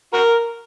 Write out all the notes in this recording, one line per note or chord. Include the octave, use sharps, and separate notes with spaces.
F#4 A#4